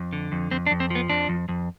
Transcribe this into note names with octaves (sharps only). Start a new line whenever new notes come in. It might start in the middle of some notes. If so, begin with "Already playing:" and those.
Already playing: F2
D3
F2
F2 C4
D4
F2
C4
F3 B3
F2 D4
F2
F2